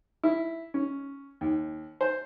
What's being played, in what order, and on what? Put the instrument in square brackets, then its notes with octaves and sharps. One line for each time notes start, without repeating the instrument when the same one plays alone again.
[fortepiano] E4
C#4
D#2
C5